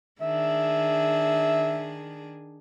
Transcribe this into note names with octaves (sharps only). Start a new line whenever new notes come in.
D#3 D4 G#4 E5